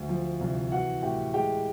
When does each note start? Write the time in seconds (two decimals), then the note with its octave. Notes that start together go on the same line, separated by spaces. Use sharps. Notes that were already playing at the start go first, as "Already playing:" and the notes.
Already playing: D2
0.09 F3
0.41 C2
0.71 E3 F#4 F#5
1.02 A2 G4 G5
1.34 G#3 G4 G5